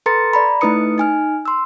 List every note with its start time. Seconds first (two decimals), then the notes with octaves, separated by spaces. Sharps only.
0.06 A4 B4 A#5 C6 A6 C#7
0.33 D5 A#5 B5
0.61 A3 D#4 E4 B4 D#6 C#7
0.98 D#4 G#5 F6
1.45 C6 E6